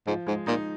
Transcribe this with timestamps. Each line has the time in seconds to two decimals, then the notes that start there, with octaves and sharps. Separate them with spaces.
0.07 G#2 F3
0.27 G#2 G#3
0.47 A#2 D#4